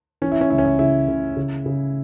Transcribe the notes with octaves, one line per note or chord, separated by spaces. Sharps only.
E3 C#4
E4
C#4
C#2 E4
C#4
E4
C#3 E4
C#3
C#3
C#3